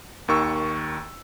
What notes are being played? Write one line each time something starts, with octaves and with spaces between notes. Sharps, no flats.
D#2 D#3 C#6 E6